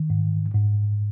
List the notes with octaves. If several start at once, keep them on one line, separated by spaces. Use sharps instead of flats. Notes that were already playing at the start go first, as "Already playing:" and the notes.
Already playing: D#3
G#2
G#2